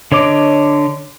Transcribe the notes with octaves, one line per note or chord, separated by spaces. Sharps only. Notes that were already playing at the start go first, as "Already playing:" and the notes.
D3 C#5 D#5 D6